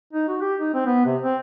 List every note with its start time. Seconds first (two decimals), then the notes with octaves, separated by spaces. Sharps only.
0.13 D#4
0.28 F#4
0.41 G4
0.60 D#4
0.74 C4
0.86 B3
1.05 C3
1.23 C4